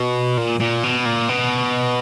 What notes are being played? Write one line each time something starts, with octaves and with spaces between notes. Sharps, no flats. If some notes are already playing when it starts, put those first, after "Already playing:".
Already playing: B2
A#2
A#2
B2
A#2
B2